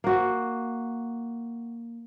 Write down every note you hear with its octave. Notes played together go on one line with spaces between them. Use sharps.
A#3 F#4